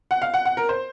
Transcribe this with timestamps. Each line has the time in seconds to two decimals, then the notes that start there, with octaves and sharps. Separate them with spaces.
0.11 F#5
0.22 F5
0.34 F#5
0.45 F#5
0.57 A#4
0.69 C5